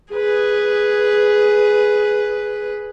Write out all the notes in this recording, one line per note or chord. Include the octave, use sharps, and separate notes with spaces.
G#4 B4